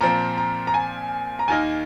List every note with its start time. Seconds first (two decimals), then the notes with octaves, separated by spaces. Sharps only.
0.01 A#2 F3 C4 A#5
0.37 A#5
0.67 A#5
0.74 G#5
1.39 A#5
1.48 D#2 D#3 A#3 D#4 G#5